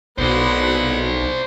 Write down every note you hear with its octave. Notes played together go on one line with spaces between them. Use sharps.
B1 B3 C5 D5 F#5